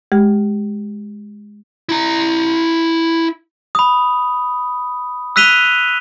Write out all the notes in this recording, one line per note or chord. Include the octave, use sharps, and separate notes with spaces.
G#3 G4
E4 A#5
B5 D#6
E6 F#6 B6 D#7 F7 G7